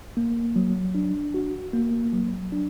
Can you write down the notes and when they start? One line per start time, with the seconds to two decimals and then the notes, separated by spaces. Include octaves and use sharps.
0.17 A#3
0.56 F#3
0.95 D4
1.34 F#4
1.74 A#3
2.13 F#3
2.52 D4